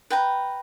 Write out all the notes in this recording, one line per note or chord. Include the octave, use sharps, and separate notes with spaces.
B4 G5 A#5